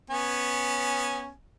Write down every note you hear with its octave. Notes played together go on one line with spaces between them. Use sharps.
B3 C#4 G#5